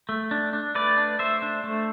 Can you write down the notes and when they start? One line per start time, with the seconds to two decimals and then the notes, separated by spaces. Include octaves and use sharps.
0.09 A3
0.31 D4
0.53 D4
0.75 A3 B4 D5
0.98 D4
1.19 A3 C5 E5
1.42 D4
1.64 A3